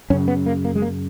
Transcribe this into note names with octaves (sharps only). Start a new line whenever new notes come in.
F#2 C#3 C#4
B3
A#3
A#3
G#3
A#3